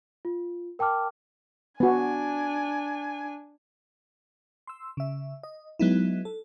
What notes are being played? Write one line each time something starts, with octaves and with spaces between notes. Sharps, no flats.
F4
A#4 G5 A5 D6 F6
B3 D4 F#4 G#5
C6 E6
C#3 E5
D#5
F#3 G#3 B3 D#4 E4
A4